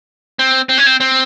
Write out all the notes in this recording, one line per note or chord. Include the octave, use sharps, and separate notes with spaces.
C4
C4
C#4
C4
C4